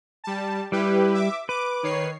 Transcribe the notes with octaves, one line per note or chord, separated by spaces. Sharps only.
G3 A5
G3 E4 G4 B4
E5 D6
B4 D6
D#3 C#5 C7